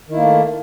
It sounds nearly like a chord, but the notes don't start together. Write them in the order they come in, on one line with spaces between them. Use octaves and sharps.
D#3 E4 A#3 A3